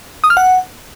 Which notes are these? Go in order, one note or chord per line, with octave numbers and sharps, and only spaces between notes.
D#6
F6
F#5